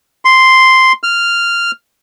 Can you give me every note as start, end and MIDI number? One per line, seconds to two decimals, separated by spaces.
0.25 0.92 84
1.03 1.71 89